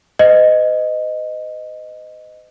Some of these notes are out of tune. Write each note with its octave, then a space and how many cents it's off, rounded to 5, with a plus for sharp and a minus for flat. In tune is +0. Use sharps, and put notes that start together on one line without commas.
B4 +45 D#5 -5